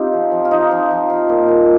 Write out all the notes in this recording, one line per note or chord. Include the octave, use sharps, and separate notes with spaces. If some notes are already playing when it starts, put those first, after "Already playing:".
Already playing: C4 D#4 F4 G4
F3
F3
F4
F3 D#4
F3
F3
F3
A#2
A#2